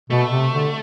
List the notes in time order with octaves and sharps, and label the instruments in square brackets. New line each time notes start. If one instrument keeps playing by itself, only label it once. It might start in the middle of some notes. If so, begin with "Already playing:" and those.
[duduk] B2 [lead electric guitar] A3
[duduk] C3
D3